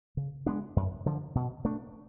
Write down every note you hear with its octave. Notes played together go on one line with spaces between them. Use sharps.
C#3
G#3 B3 D4
F#2
D3 F3
B2
A3 D4